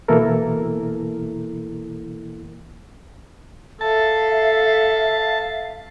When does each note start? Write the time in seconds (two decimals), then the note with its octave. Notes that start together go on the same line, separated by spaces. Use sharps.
0.08 B2 E3 A#3 E4 A4 A#4
3.81 A4 E5 F5 A5